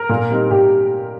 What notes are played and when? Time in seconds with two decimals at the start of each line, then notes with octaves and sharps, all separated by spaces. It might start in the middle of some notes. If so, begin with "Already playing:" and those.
Already playing: A#4
0.09 A#2
0.30 G3 C4 D#4
0.51 A#2 G4